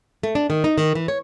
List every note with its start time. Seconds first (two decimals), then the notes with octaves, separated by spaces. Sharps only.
0.23 A3
0.35 D4
0.50 D#3
0.64 D#4
0.78 D#3
0.95 E3
1.08 C#5